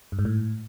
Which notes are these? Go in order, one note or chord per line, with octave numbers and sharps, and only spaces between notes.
G2
G#2
A2